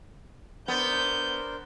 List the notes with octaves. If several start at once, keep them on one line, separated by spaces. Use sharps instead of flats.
B3 D4 A#4 C5 G6